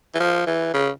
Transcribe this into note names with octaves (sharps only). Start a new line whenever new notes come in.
E3
F3
E3
C#3